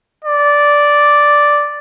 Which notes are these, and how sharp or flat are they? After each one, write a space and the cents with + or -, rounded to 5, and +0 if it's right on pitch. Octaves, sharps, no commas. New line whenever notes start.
D5 -5